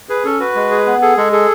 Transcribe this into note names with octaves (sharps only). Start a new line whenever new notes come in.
G#4 B4
C#4 A4
F#4 B4
G#3
G#4
B3
G#4 A4
G#3 A4
G#4 A4